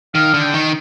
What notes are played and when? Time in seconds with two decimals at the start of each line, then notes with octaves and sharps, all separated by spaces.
0.14 D#3 F5
0.34 D3
0.40 G5
0.54 D#3